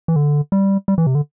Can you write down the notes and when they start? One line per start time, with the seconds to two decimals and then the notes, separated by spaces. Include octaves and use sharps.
0.08 E3
0.16 D3
0.52 G3
0.88 G3
0.98 E3
1.07 C3
1.15 D3